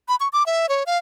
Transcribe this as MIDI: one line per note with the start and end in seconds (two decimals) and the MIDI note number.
0.08 0.16 83
0.20 0.28 85
0.33 0.46 86
0.46 0.69 76
0.69 0.83 73
0.86 0.98 77